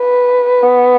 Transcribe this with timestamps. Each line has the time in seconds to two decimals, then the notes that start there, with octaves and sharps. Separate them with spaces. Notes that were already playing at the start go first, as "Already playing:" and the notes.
Already playing: B4
0.63 B3